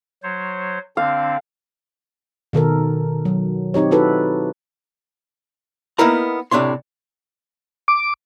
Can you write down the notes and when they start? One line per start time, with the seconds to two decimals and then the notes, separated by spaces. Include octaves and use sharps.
0.23 F#3 C5 C#5
0.97 D3 C4 D4 F5
2.53 B2 D#3 A4 A#4
3.25 F#3
3.74 C4 D#4 G4 C#5
3.91 D#4 E4 F#4 A4 B4
5.99 A#3 B3 D#4 E4 A#4 A#5
6.51 A2 C3 D4 C#5 C6
7.88 D6